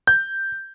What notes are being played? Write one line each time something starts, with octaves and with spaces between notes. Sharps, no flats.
G6